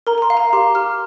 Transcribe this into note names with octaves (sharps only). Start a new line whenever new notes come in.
A#4 A#5
A#5
C6
F5
A#5
G4 C6
G4 F6